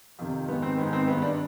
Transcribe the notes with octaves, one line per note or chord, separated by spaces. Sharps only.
F2 C3 D#3
G#2 D#3 B3
C4
G#2 D#3 B3
C4
G2 D#3 B3
D4